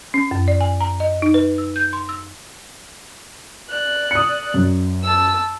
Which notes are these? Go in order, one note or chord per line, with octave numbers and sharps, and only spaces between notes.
C#4
F#2
D5
G#5
A#5
D#5
D#4
B4
E6
G6
C6
E6
D5 F#6
D#6 C#7
F#2
A5 E6